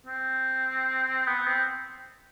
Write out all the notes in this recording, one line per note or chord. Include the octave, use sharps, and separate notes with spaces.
C4
B3
C4